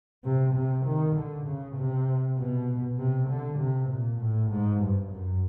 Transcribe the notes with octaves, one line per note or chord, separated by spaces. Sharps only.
C3
C3
D#3
D3
C#3
C3
B2
C3
D3
C3
A#2
A2
G#2
G2
F#2